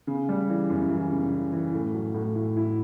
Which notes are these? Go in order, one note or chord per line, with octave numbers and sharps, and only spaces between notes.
C#3
G3
E3
F#2
E3
C#3
E3
E3
A2
F#3
A2
E4
E4